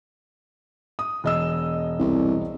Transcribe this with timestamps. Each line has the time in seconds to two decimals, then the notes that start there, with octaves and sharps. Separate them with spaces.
0.99 D#6
1.24 E1 D#5 E6
1.99 C2